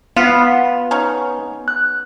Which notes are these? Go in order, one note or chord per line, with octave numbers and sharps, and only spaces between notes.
B3 F4
C#4 D#4
F#6